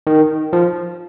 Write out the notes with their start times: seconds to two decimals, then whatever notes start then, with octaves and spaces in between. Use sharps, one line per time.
0.07 D#3
0.53 F3